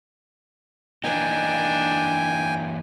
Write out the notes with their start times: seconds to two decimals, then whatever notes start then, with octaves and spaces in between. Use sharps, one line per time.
1.04 E3 A#3 D4 D#4 G5 G#5